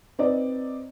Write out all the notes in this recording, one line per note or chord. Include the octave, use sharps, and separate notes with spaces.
C4 D#4 B4 D5 D#5